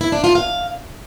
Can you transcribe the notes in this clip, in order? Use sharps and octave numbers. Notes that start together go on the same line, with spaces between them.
E4
D4
F4
F5